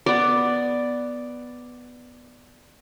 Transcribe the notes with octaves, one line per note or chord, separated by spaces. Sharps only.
B3 D5